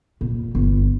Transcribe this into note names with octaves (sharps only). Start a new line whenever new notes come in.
A#2
G1